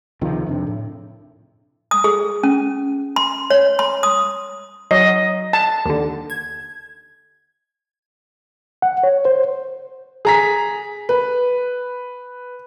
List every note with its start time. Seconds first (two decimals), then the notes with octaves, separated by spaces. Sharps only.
0.21 C#2 C3 D#3 F3
0.47 F2 C3 D4
0.67 A2
1.91 D#6
2.04 G#4
2.43 C#4
3.16 C6
3.50 C#5
3.79 C6
4.03 D#6
4.91 F#3 D#5
5.53 A5
5.86 D#2 D3
6.30 G#6
8.82 F#5
9.03 C#5
9.25 C5
10.25 G#4 A#5 B6
11.09 B4